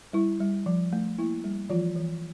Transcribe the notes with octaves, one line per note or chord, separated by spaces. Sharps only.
G3 E4
G3
F3
A3
A#3 E4
G3
E3 F3 F4
E3